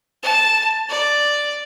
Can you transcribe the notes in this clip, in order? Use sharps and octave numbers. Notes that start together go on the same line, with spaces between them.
A5
D5